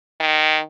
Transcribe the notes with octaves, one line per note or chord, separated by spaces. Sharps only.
D#3